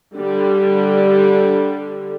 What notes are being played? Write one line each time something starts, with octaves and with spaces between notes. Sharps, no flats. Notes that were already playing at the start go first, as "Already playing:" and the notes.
D3 G3